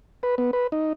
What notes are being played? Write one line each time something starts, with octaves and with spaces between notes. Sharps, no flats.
B4
B3
B4
D#4